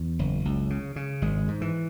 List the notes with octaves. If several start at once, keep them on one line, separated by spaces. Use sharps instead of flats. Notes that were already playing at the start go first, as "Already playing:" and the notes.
Already playing: E2
F#1
C#2
C#3
C#3
G#1 G#3
G#2
E3